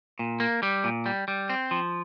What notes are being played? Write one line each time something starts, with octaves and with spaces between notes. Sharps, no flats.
A#2
A#3
G3
A#2
G3
G3
C4
F3